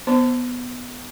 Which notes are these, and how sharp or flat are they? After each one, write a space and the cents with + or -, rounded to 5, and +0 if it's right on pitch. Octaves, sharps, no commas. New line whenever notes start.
B3 +0 C5 +0 C6 -40